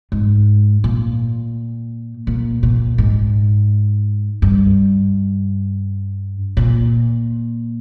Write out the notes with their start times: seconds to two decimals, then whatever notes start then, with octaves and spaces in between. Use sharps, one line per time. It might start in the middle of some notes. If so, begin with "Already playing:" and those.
0.12 G#2
0.84 A#2
2.27 A#2
2.63 A#2
2.98 G#2
4.42 G2
6.57 A#2